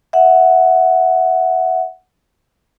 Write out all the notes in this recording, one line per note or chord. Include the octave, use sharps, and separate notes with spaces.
E5 F#5